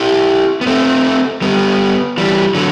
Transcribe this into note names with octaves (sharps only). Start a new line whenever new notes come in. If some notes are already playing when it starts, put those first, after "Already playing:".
Already playing: E4 G4
B3
A3 C4
G3 B3
E3 G3
D3 F#3